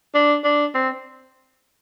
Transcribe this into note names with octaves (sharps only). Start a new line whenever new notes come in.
D4
D4
C4